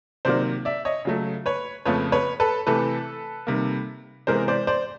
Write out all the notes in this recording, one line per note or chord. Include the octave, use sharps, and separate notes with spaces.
C3 D#3 F#3 A#3 C5 D5
D5 E5
C#5 D#5
C#3 F#3 A3
B4 C#5
F2 C#3 F3 A3 B4 C#5
B4 C#5
A4 B4
C3 E3 A3 A4 B4
C3 D#3 G3 A#3
C3 E3 G#3 B3 A#4 C5
C5 D5
C5 D5